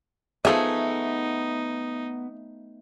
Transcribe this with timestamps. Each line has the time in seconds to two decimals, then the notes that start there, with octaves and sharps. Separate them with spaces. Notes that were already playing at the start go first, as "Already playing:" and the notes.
0.45 F3 A3 B3 D#4 G#4 A4 E5